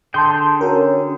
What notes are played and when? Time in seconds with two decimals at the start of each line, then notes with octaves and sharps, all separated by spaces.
0.14 D3 G#4 G5 A5 C6 G6
0.61 C#4 F#4 A#4